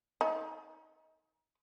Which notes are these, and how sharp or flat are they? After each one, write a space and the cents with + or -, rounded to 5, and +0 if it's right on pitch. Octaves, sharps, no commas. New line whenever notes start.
D#4 +25